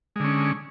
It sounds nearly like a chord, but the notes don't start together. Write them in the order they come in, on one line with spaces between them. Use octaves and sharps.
G#3 D3 C#4